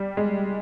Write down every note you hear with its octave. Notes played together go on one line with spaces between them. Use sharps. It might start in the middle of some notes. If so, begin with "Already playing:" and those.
Already playing: G3
G#3